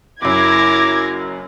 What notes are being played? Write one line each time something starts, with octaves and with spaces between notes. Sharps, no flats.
F#1 F#2 E4 A#4 D6 G#6 A#6